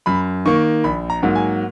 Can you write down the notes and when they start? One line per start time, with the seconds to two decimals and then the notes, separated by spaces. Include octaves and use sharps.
0.06 F#2 B5
0.46 D#3 A#3 C#6
0.84 A#1 B5
1.10 A#5
1.23 G#2 F#3 A#3
1.36 G#5